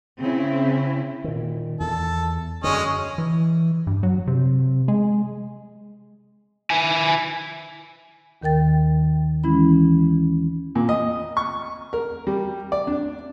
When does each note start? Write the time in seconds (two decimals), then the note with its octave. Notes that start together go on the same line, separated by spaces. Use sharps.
0.19 C#3 C4 C#4 E4
1.24 A#2 D#3
1.80 E2 A4
2.64 F#2 D3 G#3 C#4 D#5
3.18 E3
3.87 G2
4.03 F#3
4.27 C3
4.88 G#3
6.70 E4 G#5
8.42 D#2 D#3 A#4 G5 A6
9.44 E3 G#3 C#4 E4 B5
10.75 A#2
10.89 D#5
11.37 C#6
11.93 A#4
12.27 G3
12.72 D5
12.87 D4